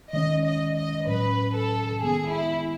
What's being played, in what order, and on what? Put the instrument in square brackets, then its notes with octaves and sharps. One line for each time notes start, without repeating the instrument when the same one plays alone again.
[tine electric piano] D#3 G#3 C#4 [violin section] D#5
[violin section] D#5
D#5
[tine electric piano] A2 F#3 C#4 [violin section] B4
[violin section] A4
[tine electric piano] D#3 G#3 B3 [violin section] G#4
[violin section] E4